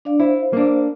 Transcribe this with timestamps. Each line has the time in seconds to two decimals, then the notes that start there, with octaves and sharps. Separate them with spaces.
0.05 D4 D5 F5
0.20 E4 C5 F5
0.53 A#3 D4